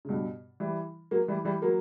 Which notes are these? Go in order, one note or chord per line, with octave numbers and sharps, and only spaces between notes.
C#3
G2 B2
E3 G3
F#3 A#3
E3 G3
E3 G3
F#3 A#3